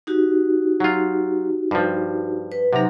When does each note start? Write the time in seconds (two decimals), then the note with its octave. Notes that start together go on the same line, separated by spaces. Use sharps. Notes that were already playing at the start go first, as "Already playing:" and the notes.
0.07 D#4 F#4 G4
0.80 F#3 F4
1.71 G2 F3
2.52 B4
2.73 C3 F#3 D#4 A#5